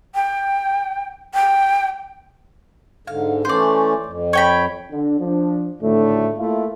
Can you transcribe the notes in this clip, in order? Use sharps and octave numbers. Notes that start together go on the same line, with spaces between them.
G5
G5
G#2 D3 F5
E3 A3 C#4 C5 D5
F2
C#5 G5 B5
D3
F3 D4
G#1 D2 A2 D3 A3 D4
A3 A#3 E4 F4